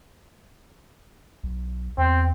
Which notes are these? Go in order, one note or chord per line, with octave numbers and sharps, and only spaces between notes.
B1
E2 C4